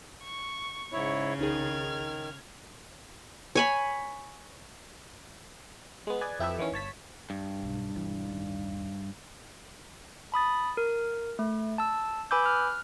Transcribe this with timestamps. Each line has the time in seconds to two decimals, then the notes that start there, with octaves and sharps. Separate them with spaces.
0.23 C#6
0.93 G#2 C#3 E4 C#5
1.38 C2 D#3 D#4 G#4 F6 G#6
3.55 C#5 G#5 B5
6.07 G#3 B3
6.21 G#4 B4 D5 G#5
6.39 F2 E4 G4 A4 B4 E5
6.58 D#3 E3 B3 C#4
6.72 G1 C#5 A5 B6
7.30 G2
7.59 E1 B1
7.94 E1 E3
8.26 A1 D#2
10.32 A5 B5 D#6 A6
10.77 A#4
11.39 A3
11.78 A5 E6
12.31 B4 G#5 B5 D6 E6 G6
12.46 F6 F#6